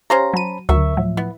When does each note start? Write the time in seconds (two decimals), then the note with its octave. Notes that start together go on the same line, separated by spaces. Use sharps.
0.10 C#4 G4 C5 C#5 F5 A#5
0.34 F#3 A5 B5 D#7
0.69 D2 D3 F#3 A#4 E5 C#6
0.97 A2 F3 F#3
1.17 B3 E4